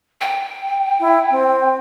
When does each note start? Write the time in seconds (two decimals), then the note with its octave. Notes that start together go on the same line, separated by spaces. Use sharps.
0.21 G5
1.00 E4
1.31 C4